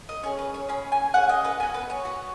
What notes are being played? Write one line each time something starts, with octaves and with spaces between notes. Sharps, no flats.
D#5
C#4 G#4 C#5
B4
C#5
C#4 G#4 B5
G#5
C#4 G#4 F#5
D#5
B4
B3 F#4 G#5
B4
C#5
B3 F#4